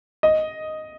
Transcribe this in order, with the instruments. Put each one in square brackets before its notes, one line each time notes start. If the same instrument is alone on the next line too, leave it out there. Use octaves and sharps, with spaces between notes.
[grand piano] D#5